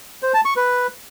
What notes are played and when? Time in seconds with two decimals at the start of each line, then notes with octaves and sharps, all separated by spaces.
0.23 C5
0.34 A5
0.45 C#6
0.56 B4